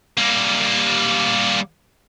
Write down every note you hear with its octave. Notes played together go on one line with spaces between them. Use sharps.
G3 A#3